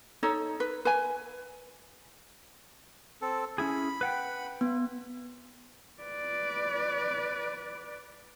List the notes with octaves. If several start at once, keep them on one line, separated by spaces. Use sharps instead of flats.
D#4 A4 C#5
B4
B4 G#5
C4 A4
C#4 E4 G#4 B5
B4 F#5 G5
B3
B4 D5